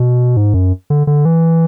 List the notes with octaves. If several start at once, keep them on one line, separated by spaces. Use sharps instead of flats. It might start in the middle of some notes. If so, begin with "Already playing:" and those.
Already playing: B2
G#2
F#2
D3
D3
E3